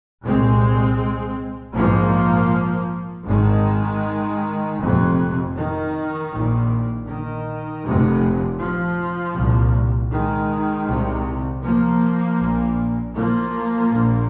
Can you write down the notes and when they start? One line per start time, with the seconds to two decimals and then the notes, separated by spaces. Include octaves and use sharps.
0.24 C2 A#2 G#3 C4
1.75 A#1 G#2 F3 A#3
3.27 G#1 G#2 D#3 G#3
4.79 F1 F2 C3
5.56 D#3
6.32 A#1 A#2
7.08 D#3
7.84 F1 F2 C3
8.59 F3
9.36 C2 A#2
10.12 D#3 G#3
10.88 C2 C3
11.63 F3 A#3
12.40 A#1 A#2
13.15 F3 A#3
13.92 A#1 A#2